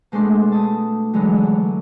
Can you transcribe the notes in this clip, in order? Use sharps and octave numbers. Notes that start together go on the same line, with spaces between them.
B2 G#3 A3 D4 C6
A5 D#6
D3 E3 F#3 G#3
D3